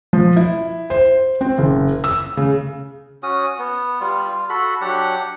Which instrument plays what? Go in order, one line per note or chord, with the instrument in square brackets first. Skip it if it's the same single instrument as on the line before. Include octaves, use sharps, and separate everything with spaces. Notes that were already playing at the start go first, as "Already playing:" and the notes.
[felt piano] F3
E4
C5
C4
F#1
E6
C#3
[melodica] C#4 F#4 D#6
B3
G3 F4
F4
F#4 A4 B5
F#3 D4 G4 F#5